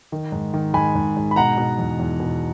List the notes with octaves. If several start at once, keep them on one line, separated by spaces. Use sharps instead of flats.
D#3
G#2
D#3
G#2 G#5 B5
G#2
G#2
B5
B2 F#5 A#5
B2
E2
E2
B2